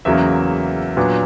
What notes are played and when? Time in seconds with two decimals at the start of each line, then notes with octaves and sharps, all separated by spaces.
0.05 E2 C#3 F#3 A#3 E5
0.97 A#2 F#3 B3 D4